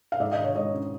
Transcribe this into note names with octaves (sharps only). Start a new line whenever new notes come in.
F5
G#2 D5 E5
D#5 F5
D#3
C#5 D#5
G#3 C#5 D#5
C#4